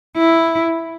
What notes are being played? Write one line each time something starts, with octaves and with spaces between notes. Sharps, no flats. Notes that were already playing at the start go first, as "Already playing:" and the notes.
E4